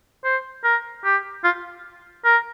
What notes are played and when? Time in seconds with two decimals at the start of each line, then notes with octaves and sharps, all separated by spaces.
0.24 C5
0.64 A#4
1.05 G4
1.44 F4
2.25 A#4